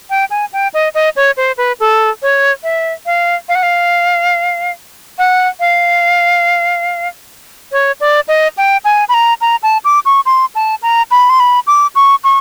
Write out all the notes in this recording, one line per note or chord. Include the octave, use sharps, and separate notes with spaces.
G5
G#5
G5
D#5
D#5
C#5
C5
B4
A4
C#5
E5
F5
F5
F#5
F5
F#5
F5
C#5
D5
D#5
G5
G#5
B5
A#5
A#5
A5
D6
C#6
C6
A5
A#5
B5
C6
B5
D6
C#6
C#6